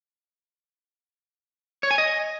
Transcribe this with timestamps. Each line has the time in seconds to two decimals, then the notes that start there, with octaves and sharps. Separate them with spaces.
1.83 C#5
1.91 G#5
1.98 D#5